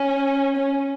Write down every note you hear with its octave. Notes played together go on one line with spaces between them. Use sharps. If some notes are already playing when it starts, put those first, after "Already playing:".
Already playing: C#4
C#4